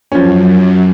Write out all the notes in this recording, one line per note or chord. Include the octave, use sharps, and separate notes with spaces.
F#2 F3 C#4